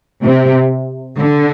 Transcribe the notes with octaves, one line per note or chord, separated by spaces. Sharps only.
C3
D3